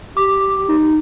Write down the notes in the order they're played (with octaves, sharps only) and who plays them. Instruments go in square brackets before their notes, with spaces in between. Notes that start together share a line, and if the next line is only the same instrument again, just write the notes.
[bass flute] G4 [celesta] D6
[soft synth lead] D#4